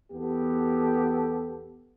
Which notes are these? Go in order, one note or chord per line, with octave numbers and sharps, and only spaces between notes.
E2 B3 G4 A4